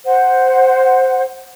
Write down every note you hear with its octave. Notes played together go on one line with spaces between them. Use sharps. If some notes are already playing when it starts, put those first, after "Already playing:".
C5 F#5